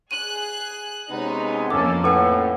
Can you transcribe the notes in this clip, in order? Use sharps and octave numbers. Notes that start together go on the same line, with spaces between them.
G#4 F#6 D#7
C3 G#3 B3 C#4 D#4
F2 F3 A#3 C#4 A4 D6
A2 C#4 A4 B4 F#5 E6